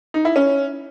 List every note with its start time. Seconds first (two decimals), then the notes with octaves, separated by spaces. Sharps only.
0.14 D#4
0.25 E4
0.36 C#4